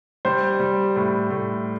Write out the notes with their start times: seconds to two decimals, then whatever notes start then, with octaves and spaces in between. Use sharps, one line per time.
0.25 G3 C5
0.60 G3
0.96 A2
1.30 A2